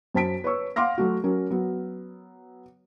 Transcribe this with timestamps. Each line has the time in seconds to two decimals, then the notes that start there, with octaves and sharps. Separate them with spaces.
0.14 F#2 C5 A5 B6 D7
0.44 B4 C#5 C#6 E6
0.76 F5 F#5 C6 D6 F6 A#6
0.98 F#3 A3 F#4
1.24 F#3 C#4 A#4
1.51 F#3 B3